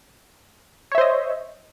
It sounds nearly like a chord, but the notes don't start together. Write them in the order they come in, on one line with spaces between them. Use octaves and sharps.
C#5 E5 C5 D#5